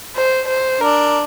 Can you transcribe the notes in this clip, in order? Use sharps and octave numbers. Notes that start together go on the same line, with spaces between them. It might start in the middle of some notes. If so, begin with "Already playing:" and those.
C5
C5
D4 A#4